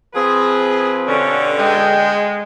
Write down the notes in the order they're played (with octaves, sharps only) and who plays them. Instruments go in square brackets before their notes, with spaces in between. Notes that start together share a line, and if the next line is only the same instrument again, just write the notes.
[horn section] F3 C4 B4 [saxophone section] G#4
[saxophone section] G2 B2 D3 [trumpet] C#4
[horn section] G#3 [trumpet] G5